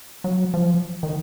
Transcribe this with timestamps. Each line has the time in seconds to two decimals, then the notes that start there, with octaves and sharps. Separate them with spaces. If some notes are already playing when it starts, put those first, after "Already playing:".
0.24 F#3
0.54 F3
1.03 D#3